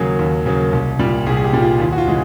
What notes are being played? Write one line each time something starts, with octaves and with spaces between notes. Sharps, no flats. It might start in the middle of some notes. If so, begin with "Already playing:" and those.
Already playing: D#2 C#3 F#3 A#3 G#4
D#2
C#3 F#3 A#3
C2
A#2 G3
C2 G#4
G#4
G4
A#2 G3
F4
D#2 F4
F#4
F4
C#3 E3 G#3